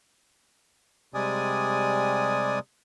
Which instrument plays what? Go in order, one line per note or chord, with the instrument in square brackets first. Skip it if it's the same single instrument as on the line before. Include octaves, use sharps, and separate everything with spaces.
[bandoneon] C3 G3 G#3 D5 G#5 D#6